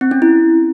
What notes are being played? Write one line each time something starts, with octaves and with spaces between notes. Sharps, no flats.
C4
C#4
E4